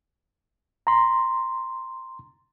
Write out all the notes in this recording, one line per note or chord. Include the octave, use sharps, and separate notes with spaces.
A#5 C6